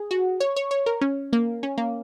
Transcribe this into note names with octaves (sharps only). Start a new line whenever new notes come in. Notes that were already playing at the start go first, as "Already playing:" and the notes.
Already playing: G#4
F#4
C#5
C#5
C#5
A#4
C#4
A#3
C#4
A#3